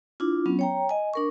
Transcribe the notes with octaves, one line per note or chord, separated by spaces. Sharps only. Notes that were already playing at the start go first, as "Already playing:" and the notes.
D4 E4 F4
F#3 B3 C#4
C#5 G5 A#5
D#5 G#5
D4 A#4 C#6